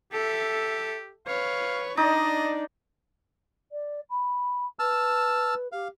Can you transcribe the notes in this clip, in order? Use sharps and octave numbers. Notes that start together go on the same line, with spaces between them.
G4 A4 E5
B4 C#5 F5
D4 D#4 D5 D#5
D5
B5
B4 A5 E6 F6
G4 F5